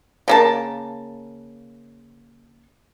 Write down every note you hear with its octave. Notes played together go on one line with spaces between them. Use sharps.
C#3 A#3 A5